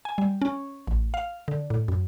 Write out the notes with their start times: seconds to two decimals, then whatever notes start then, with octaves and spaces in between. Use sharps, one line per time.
0.05 G#5
0.18 G3
0.42 C#4
0.87 A1
1.14 F5
1.48 D3
1.70 A2
1.88 F#2